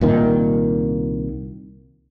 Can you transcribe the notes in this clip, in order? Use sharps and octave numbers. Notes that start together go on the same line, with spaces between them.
C2 A#2 D#3